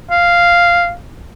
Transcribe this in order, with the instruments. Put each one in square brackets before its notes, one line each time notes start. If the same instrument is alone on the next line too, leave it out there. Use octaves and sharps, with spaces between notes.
[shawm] F5